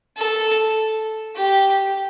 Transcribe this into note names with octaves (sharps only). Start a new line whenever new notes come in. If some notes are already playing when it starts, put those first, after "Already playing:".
A4
G4